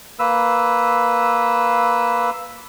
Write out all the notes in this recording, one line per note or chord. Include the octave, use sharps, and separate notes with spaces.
A#3 B4 E6